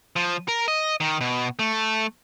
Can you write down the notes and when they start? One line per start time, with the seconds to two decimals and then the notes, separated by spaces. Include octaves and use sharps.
0.16 F3
0.48 A#4
0.68 D#5
1.00 D#3
1.21 B2
1.59 A3